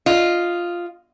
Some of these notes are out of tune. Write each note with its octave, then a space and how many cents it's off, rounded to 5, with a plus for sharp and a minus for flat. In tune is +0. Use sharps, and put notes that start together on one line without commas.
F4 +0 D#5 +0